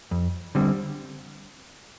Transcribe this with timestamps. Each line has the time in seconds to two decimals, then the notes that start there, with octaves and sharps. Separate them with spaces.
0.11 F2
0.55 D3 G3 C4